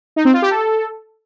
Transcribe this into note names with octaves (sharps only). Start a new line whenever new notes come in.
D#4
C4
F4
G4
A4